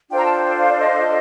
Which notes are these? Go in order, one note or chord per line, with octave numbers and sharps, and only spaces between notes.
D4 F4 A4 C5 G5
A#5
A5
G5
F5
D5
D#5